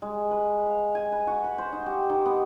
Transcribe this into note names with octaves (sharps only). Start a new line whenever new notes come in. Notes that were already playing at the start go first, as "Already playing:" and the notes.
G#3
B4
F5
G#5
B4
F#4
B5
C5
D#4
G4
D#3
B3